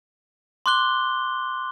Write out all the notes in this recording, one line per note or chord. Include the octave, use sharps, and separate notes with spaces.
C6 D6 F#6 G7